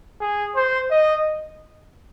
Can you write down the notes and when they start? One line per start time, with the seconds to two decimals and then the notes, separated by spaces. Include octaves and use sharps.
0.21 G#4
0.56 C5
0.90 D#5